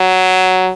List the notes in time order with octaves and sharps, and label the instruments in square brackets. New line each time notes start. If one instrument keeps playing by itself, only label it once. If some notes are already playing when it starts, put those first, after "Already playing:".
Already playing: [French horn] F#3